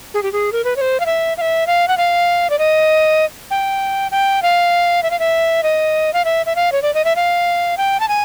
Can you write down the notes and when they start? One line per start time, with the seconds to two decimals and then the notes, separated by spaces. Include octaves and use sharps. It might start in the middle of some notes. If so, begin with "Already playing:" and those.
0.14 G#4
0.23 G4
0.33 G#4
0.52 A#4
0.64 B4
0.76 C#5
0.81 C5
1.00 F5
1.06 E5
1.37 F5
1.41 E5
1.67 F5
1.88 F#5
1.97 F5
2.50 D5
2.59 D#5
3.51 G5
4.11 G5
4.42 F5
5.03 E5
5.11 F5
5.19 E5
5.63 D#5
6.13 F5
6.25 E5
6.46 E5
6.56 F5
6.72 C#5
6.82 D5
6.94 D#5
7.05 E5
7.16 F5
7.78 G5
8.00 A5
8.09 G#5